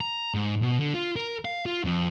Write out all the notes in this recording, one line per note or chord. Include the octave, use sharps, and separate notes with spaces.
A#5
G#2
B2
D3
F4
A#4
F5
F4
F2